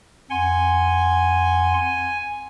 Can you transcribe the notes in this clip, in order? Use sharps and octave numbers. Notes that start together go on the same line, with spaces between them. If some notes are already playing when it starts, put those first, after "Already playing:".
F2 F#5 G#5 C6